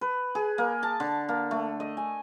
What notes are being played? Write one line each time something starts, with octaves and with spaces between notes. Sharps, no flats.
B4
G#4
A#3
A5
D3
A#3
A3
D#5
G#5